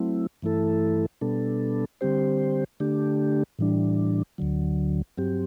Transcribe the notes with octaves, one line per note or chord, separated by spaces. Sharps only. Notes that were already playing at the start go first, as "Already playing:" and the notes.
Already playing: F#3 A3 C4 E4
G2 E3 A3 E4 A4
B2 G3 B3 D4 A4
D3 G3 C4 G4 C5
D3 A3 D4 G4
A2 E3 G3 D4
D2 D3 F#3
G2 F#3 C4 G4